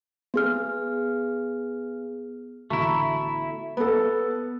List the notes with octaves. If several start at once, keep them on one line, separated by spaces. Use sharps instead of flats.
B3 G#4 F6
A1 D3 A3 B3 E4 F#4 A#5 C#6
B3 A4